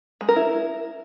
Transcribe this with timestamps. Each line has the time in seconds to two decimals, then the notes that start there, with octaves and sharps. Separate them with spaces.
0.21 G#3
0.29 A#4
0.36 E4